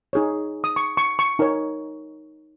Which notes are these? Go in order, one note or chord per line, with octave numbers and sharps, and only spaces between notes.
D#4 G#4 C#5
D#6
C#6
C#6
C#6
D#4 A#4 C#5